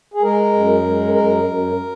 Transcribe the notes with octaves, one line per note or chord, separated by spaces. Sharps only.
G#4
G#3 A#4
F#2
G#3
F#2 A#4
F#2